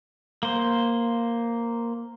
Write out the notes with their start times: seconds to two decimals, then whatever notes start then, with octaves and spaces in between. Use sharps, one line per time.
0.43 A#3 C5